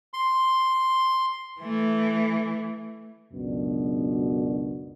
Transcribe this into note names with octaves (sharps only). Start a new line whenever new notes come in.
C6
E3 A3
C#2 F#2 B2 D4